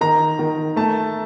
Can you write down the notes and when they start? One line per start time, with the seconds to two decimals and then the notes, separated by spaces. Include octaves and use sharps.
0.01 D#3 A#5
0.39 D#3
0.76 A3 A5